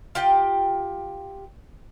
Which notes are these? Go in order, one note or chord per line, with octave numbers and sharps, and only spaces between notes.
F4 G4 G5